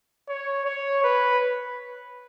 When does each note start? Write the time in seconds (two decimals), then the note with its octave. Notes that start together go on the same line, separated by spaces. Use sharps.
0.28 C#5
0.66 C#5
1.04 B4